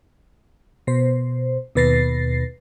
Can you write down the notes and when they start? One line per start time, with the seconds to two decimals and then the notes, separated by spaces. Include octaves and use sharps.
0.87 B2 C5
1.75 D#2 B2 B4 A6 A#6 C7